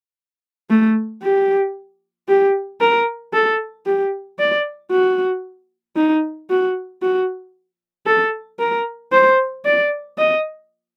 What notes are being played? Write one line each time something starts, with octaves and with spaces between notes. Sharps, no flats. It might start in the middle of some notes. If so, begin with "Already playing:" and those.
A3
G4
G4
A#4
A4
G4
D5
F#4
D#4
F#4
F#4
A4
A#4
C5
D5
D#5